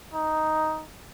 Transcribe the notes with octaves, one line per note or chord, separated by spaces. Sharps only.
D#4